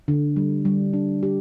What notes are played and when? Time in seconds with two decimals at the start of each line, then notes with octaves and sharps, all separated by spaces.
0.08 D3
0.36 G3
0.65 G3
0.93 D4
1.23 G4